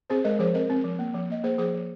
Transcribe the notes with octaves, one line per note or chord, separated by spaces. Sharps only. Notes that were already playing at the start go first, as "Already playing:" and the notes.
C4 G#4 C5
G#3 A#4 D#5
F3 G#4 C5
C4 A#4 D#5
C4
F3
A#3
F3
A#3 D#5
A#3 G#4 C5
F3 G#4 C5
F3